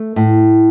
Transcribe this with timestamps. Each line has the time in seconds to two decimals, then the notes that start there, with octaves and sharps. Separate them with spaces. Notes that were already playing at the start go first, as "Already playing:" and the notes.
Already playing: A3
0.16 A2